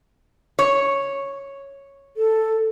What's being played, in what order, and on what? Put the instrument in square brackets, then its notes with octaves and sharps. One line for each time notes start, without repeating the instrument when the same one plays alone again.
[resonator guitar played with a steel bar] C#5
[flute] A4